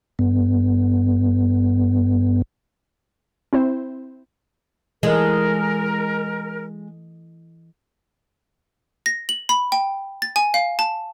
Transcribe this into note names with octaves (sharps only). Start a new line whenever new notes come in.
G2 B3
C4 E4 C5
E3 G#3 A4 A#4 D#5
A#6
F#7
B5
G5
A6
G#5
F5
A5